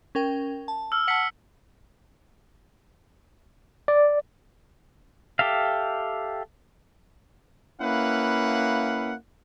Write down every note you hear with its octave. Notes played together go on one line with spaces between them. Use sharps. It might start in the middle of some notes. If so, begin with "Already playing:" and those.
C#4 A#4 G5
A5
E6 F6
F#5 A5 B6 C#7 F#7
D5
G4 A4 E5 F5
A#3 C#4 E4 B4 F5 F#5